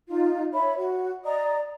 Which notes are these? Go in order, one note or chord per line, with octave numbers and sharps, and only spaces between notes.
D#4 F4
C#5 E5 B5
F#4
D5 D#5 A#5 D#6